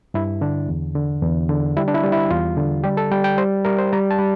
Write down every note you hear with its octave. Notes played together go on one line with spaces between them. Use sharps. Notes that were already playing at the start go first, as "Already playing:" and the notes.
G2 E4
D3 D4
E2
D3
E2
D3
G3 E4
D4
E4
G3
E4
E2 F4
D3
G3 G4
A4
G3 G5
G5
G3 C5
G3 A#4
C5
G3 A#5
A5
G3